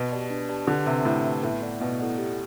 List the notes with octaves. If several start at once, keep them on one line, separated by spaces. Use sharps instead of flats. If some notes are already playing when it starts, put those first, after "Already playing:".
Already playing: B2
G4 B4 D5 A5
D4
G4 B4 D5 A5
D3 G4
C3 B4 E5 A5
A2 G4
B4 E5 A5
A2 B3
E4 A4 D5 F#5
B2 B3
E4 A4 D5 F#5
G4